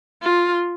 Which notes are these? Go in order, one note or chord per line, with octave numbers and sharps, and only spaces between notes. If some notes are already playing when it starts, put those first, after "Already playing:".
F4